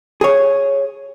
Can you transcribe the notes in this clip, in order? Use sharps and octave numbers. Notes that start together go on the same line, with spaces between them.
G#4 C#5